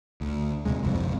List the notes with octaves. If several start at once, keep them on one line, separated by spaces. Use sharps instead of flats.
D2
D#2 C3 G#3
G1 C2 F2